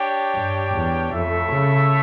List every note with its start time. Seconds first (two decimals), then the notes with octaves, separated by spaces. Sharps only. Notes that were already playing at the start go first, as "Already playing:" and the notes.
Already playing: D4 G4 C#5 G5
0.35 G2
0.74 E2
1.13 F2 A3 E4 A4 C#5 E5
1.52 C#3